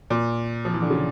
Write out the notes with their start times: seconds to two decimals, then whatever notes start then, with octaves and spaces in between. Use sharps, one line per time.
0.10 A#2
0.65 F3
0.74 E3
0.82 D3
0.90 C#3